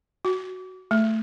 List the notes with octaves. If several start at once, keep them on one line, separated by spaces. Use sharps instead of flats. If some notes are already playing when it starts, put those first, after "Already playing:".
F#4
A3